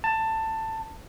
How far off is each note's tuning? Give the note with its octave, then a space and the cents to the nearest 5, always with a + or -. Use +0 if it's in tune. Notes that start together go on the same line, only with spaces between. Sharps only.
A5 +15